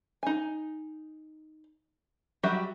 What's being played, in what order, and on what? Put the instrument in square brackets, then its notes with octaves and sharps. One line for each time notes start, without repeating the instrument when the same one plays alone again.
[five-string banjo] D#4 G#5
F#3 G3 F#4 G4 E5